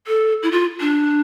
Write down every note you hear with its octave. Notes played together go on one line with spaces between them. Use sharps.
A4
E4
F4
D4